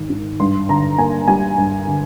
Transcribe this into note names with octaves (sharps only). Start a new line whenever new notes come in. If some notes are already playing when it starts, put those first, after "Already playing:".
Already playing: G#1 D#3
G#2
G2 C6
D3 A#5
A#3 G#5
G3 G#5
G2
D3